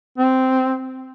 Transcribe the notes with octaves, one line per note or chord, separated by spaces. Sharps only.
C4